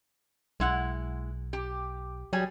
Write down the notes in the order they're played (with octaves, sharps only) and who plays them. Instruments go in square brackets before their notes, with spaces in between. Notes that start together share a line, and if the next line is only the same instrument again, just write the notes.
[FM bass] B1 [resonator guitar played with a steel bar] G#3 E4 F#5
[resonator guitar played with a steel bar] G4
[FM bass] F#3 [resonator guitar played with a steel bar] G3 G#4 G#5